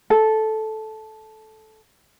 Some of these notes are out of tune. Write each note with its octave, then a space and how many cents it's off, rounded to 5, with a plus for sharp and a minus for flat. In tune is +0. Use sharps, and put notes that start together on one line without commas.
A4 -10